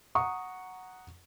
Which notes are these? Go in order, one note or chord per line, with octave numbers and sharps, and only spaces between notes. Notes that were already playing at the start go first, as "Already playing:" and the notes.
F#5 A#5 C#6 D#6